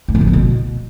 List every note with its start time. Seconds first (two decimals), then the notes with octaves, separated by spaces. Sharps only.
0.08 A3
0.15 E3
0.21 F3
0.27 B3
0.33 B2